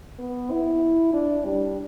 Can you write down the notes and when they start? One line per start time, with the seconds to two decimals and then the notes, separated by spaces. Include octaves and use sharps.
0.19 B3
0.51 E4
1.14 D4
1.45 G3